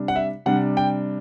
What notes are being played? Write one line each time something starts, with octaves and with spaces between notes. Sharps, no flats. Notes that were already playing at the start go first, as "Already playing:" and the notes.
Already playing: C3 G3 D4
F#5
E5
C3 G3 D4 F#5
G5